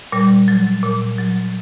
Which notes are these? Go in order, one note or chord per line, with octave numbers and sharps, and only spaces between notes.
A#2 G3
F#3
A#2
F#3